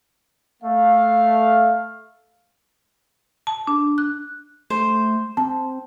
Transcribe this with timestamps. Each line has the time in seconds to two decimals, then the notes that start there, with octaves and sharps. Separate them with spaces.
0.63 A3 F5
3.47 A5
3.67 D4
3.98 F#6
4.70 A3 C5
5.37 C4 A5